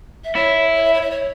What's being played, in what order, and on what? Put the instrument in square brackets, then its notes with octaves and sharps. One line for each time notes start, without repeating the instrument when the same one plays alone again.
[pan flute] E5
[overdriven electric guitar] E4 [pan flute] C#5
[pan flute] C#5
E5
C#5
E5
C#5